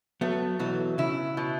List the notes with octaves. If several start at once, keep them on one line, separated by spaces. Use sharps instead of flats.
F#3 A3 B3
B2 E3 F#3
C#3 E4
B2